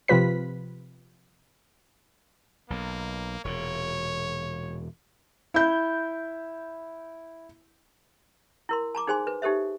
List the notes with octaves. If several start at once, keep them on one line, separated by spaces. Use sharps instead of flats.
C3 F3 F4 B4 B6
B1 A#3
E1 A#2 C#5
E4 G6
E4 A#4 C6
A5 A#5 D6
D#4 G#4 C5 G#5 C6
B4
D#4 G4 A4 C5 E5